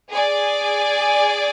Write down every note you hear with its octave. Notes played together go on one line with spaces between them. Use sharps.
G#4 D5 G#5